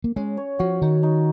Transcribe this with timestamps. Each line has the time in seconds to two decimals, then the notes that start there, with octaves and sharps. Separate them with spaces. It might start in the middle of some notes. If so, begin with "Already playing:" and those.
0.04 A#3
0.16 G#3 C#4
0.37 C#5
0.59 F3 F#4
0.82 D#3 D#4
1.03 D#4